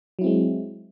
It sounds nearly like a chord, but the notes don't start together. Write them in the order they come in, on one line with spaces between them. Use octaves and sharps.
F#3 E4 C4 G#3